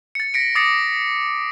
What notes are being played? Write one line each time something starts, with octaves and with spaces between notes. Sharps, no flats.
A6 C#7
A#6 B6 C#7 D7
D6 D#6 A6 A#6 C7 C#7